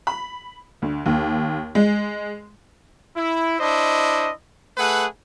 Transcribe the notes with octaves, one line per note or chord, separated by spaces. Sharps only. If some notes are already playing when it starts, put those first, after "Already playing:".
B5
D2
D#2
G#3
E4
D4 E4 C5 D#5
A3 G#4 B4 F#5